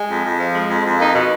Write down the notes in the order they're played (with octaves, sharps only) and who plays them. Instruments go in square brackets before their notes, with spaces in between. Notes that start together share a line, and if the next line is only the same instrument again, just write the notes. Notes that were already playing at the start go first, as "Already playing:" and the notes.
Already playing: [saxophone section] G#3
F2
F2
F3
G#3
F2
F2
A#3 D#4
B2